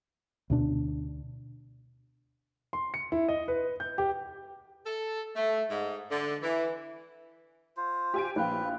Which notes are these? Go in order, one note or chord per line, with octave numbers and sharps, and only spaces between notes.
D2 B2 D4
C6
C#7
E4
D#5
B4
G6
G4
A4
A3
G#2
D3
E3
F4 C5
G4 G#5 D7
A#1 B4 F5 G5